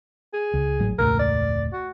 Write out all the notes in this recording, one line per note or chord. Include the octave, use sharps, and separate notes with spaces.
G#4
C#2
G#1 A2 F#3
E1 C#2 A2 A#4
D5
F#4